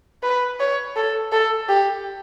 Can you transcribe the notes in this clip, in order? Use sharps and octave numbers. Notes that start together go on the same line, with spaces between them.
B4
C#5
A4
A4
G4